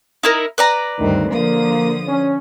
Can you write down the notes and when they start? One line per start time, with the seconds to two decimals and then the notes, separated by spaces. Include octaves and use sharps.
0.23 D#4 E4 A#4
0.58 B4 D5 A#5
0.99 D2 G2 D#3 C4
1.32 D3 F3 A#3 D#6
2.08 C#4